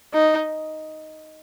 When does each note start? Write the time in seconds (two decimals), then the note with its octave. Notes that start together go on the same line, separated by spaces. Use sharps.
0.14 D#4